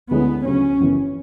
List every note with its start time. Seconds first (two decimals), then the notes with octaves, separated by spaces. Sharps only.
0.11 D2 D3 G#3 B3 C#4 E4
0.45 D2 C#3 F#3 C#4
0.80 F#1 F#2 E3 B3